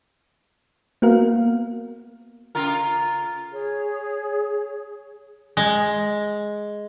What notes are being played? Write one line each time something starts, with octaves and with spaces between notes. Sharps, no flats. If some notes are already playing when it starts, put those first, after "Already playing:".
A#3 B3 F#4 A#4 F5
C#3 F4 A#4
G#4 C#5
G#3